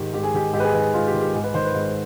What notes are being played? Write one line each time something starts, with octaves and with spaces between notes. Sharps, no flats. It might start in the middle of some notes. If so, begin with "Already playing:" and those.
Already playing: G#2 D#3 G4
G#2 G4
G#4
D#3 G4
G#2 G4
B4
G#4
D#3 B4
G#4
G#2 F4
G4
D#3
G4
G#2 G#4
B4
D#3 C5
B4
G#2